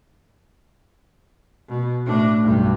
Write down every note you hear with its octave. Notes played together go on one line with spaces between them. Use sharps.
B2
A2 D4
B1 G2